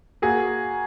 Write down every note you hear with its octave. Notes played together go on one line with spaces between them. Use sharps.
A#3 F#4 G#4